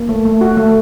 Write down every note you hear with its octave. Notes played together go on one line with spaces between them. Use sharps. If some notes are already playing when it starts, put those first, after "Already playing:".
Already playing: A#3
A3
A3
F#4
A3